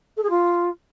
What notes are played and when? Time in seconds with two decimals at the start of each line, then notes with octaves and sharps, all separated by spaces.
0.17 A4
0.23 G#4
0.29 F4